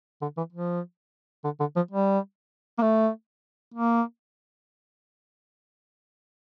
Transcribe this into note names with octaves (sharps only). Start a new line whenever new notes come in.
D3
E3
F3
D3
D3
F3
G3
A#3
A3
A#3